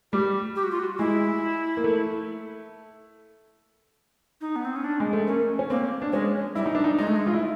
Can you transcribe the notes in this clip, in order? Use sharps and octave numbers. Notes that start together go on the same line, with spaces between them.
G3 G4
G4
F#4
F4
F#4
G#3 E4
A#3
A3
D#4
B3
C4
C#4
D4
G#3
A3
A#3 C#4
C#4
A#3 C4
D4
G#3 C#4
G3 E4
D#4
D4
D#4
G#3 D#4
A3
G#3
F4
E4